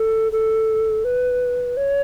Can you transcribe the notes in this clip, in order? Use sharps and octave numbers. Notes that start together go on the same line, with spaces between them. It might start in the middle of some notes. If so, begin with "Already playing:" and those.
Already playing: A4
A4
B4
C#5